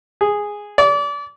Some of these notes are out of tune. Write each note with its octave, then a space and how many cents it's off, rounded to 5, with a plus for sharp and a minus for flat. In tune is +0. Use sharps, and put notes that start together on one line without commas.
G#4 -5
D5 -30